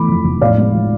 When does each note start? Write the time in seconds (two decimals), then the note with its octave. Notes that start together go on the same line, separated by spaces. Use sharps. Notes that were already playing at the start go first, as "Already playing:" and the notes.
Already playing: E3 A3 B5 D6
0.08 F2
0.24 F1
0.41 A2 D5 F5
0.58 G#3
0.74 F3